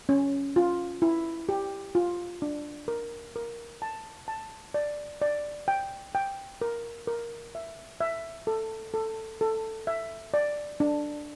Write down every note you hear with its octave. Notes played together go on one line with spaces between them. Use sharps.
C#4
F4
E4
G4
F4
D4
A#4
A#4
A5
A5
D5
D5
G5
G5
A#4
A#4
E5
E5
A4
A4
A4
E5
D5
D4